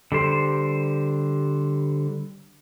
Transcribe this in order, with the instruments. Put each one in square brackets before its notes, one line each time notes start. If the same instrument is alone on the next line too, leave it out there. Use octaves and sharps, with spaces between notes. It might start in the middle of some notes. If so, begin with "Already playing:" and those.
[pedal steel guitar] D3 G3 C5